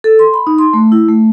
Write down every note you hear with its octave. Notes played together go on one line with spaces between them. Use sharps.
A4
C6
B5
D#4
C6
A3
E4
A3